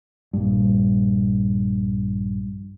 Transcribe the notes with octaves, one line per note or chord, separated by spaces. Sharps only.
A#1 G2